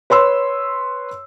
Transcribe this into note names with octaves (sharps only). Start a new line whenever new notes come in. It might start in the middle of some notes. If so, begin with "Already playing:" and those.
B4 C#5 C6 E6